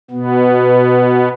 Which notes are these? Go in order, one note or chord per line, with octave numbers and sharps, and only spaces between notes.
B2 B3